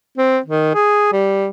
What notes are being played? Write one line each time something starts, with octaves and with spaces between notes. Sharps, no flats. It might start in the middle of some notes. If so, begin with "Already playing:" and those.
C4
D#3
G#4
G3